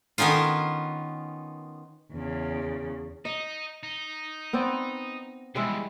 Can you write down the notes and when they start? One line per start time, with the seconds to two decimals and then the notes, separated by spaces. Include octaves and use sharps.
0.18 D#3 B3 C#4 D#4 F4
2.12 E2 C#3
3.25 D#4 D#5
3.83 D#4
4.53 B3 C4 D5
5.55 E2 G#2 G3 G#3 E4